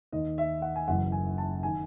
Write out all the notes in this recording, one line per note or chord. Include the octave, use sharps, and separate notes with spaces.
D#2 D#3 D#5
E5
F#5
G#5
F#1 F#2 E3 F#5
G#5
A5
D#3 G#5